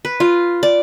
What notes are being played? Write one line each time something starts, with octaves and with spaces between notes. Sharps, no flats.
B4
F4
D5